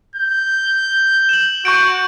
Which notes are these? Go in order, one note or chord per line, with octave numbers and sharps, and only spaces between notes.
G6
E7 F#7
F#4 C#6 G6 D7